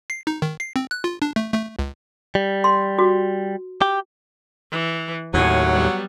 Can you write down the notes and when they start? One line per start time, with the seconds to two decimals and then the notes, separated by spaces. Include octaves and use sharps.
0.10 C7
0.27 D#4
0.42 D#3
0.60 C7
0.76 C4
0.91 F#6
1.04 F4
1.22 D4
1.36 A3
1.54 A3
1.79 C#2
2.35 G3
2.64 C6
2.99 F#4
3.82 G4
4.71 E3
5.34 D#2 A2 F#3 F#5 G#5
5.71 G3 B3